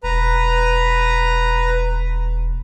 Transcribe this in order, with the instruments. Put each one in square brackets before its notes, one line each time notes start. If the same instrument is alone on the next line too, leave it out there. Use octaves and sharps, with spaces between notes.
[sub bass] E1 [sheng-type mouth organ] B4 A#5